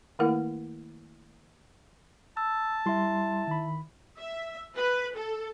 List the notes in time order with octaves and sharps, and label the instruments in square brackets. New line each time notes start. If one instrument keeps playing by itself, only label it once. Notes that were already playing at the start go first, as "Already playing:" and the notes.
[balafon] D#3 A3 A#3 E4 A#4 F#5
[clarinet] A5 [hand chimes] E6
[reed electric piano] G3 C6 [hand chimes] E4 E5
[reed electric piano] D#3 B5
[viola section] E5
B4
A4